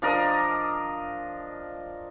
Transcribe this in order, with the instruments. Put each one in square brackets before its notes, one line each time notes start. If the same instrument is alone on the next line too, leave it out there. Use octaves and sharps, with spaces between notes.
[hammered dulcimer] F3 D4 A#4 D#5